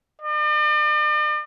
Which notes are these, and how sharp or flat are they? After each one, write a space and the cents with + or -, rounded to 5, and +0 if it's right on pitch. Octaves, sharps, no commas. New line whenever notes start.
D5 +45